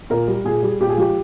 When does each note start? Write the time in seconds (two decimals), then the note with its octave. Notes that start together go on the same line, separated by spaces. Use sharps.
0.10 A#2 A#4
0.28 G3
0.45 A#2 G#4
0.63 G3
0.81 A#2 G4
0.90 G#4
0.97 F3 G#3 G4